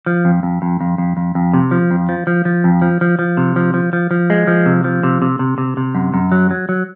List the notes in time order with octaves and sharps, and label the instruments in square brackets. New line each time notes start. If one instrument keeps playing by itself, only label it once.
[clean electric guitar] F3
F2
F2
F2
F2
F2
F2
F2
C3
F3
F2
F3
F3
F3
F2
F3
F3
F3
C3
F3
F3
F3
F3
G#3
F3
C3
F3
C3
C3
C3
C3
C3
F#2
F#2
F#3
F#3
F#3